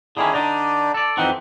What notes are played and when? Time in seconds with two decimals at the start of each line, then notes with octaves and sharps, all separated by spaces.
0.17 D3 D#3 C#4 E4 G#4
0.34 D3 D4 D#4 D5
0.94 A4 D5
1.17 F2 E3 C4 D#4 F#5